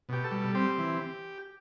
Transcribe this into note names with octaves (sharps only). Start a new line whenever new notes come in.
B2 G4
A4
G3
C4 G4
E3